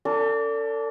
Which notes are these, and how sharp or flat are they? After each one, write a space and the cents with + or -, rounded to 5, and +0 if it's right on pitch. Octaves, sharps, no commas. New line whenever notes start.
D4 -25 A4 +40